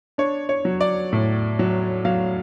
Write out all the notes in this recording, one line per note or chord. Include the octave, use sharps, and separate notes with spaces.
D4 C#5
C#5
F#3
D5
A2
F#3
F#3 F5